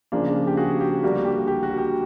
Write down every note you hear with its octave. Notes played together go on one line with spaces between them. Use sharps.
C#3 F3 A#3 D4
G4
F#4 G#4
G4
D3 G3 A#3 D4 F#4
G4
G4
F#4
G4